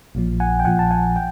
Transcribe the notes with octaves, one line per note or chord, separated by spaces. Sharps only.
A#1 A#2 F3
F#5 G#5
G5
A#1 A#2 F3 F#5 G#5
A5
F#5 G#5
G5